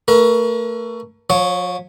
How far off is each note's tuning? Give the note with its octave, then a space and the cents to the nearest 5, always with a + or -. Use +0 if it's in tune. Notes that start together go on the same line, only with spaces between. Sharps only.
A3 +30 A#4 +40
F3 +40 C#5 +0